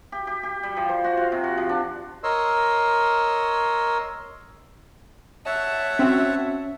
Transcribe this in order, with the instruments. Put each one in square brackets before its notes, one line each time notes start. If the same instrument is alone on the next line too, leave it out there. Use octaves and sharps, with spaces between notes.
[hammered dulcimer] G4
G4
G4
G3
F3
C5
F#4
F4
C3
F#4
F3
D4
[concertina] A#4 C#5 D#5 C6 E6
[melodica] C#5 F#5 A5 [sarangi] E5
[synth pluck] C4 F#4 [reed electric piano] C#4